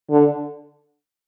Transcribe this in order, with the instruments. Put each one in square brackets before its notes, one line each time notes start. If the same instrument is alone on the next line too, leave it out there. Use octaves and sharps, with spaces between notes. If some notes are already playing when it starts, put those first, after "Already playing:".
[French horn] D3